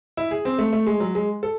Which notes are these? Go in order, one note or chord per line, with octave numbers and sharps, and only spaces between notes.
E4
G#4
C4
A3
A3
G#3
F#3
G#3
A4